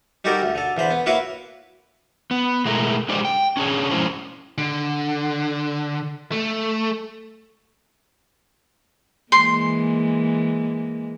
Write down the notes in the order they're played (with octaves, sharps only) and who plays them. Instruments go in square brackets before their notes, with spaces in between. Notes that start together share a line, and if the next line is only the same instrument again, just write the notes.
[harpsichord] G3 D#4 F#4 G4 A4 A#4
D2
D3 A4
E2 D3 C5 B5
B3
A#3 E4 F#4 B4 C#5 F5
[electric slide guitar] B3
B2 G#3 A3 E4 A#4
D3 G#3 G4 C5 D5 D#5
G5
C#4 D4 G#4 C#5
F3 G3 G#3 C#4 E4 C5
[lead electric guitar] D3
A3
[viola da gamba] E3 G#3 A#3 [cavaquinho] C6